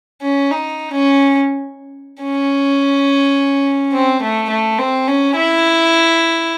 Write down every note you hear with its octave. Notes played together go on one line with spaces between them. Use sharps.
C#4
D#4
C#4
C#4
C4
A3
A3
C4
C#4
E4